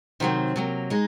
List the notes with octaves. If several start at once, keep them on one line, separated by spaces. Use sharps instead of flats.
C3 D#3 F#3 C4
C3 F#3 A#3
G#3 D#4